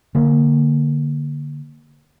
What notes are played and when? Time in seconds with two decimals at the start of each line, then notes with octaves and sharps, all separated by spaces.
0.15 D3 A#3